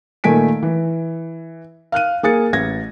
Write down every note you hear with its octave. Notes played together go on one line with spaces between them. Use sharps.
A#2 D#3 A3 G#5 B6 D7
E3
F5 F6 F#6 D#7
A#3 G#4 A6 C#7
A1 G#6 A#6